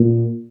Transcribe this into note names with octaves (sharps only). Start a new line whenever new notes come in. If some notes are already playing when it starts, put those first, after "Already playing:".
Already playing: A#2